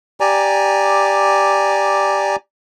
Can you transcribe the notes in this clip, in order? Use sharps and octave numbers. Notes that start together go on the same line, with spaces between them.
G4 D5 G#5 A#5